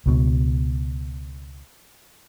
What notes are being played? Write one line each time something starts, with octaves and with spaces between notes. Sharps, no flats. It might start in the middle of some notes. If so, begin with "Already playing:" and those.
C#2 B2